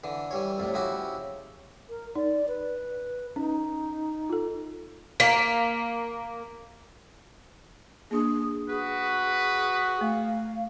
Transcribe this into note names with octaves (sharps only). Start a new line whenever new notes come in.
D3 E3
E3 G3 C#5
F2 A2 G3
C#3 F3 E4 F#4 G4
A#4
D#4 D5
B4
C#4 D#4
F4 A4
A#3 B6
A#3 D4 G#4
F#4 G#4 B4
A3 F5